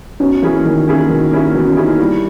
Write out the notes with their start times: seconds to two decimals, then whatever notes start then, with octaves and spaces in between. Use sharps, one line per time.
0.20 B2 C#4
0.42 E3 A#3 C#4 E4 G#4
0.65 B2 D#3
0.87 A#3 C#4 E4 G#4
1.09 B2 D#3
1.32 A#3 C#4 E4 G#4
1.54 B2 E3
1.65 C#4
1.76 A#3 C#4 D#4 E4 G#4
1.88 E4
1.99 G3 E4